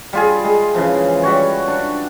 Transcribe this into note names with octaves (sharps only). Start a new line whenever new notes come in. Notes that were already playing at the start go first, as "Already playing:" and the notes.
G3 F4 G#4
G#3
C#3 E3 F3
G3 F#4 C#5
D4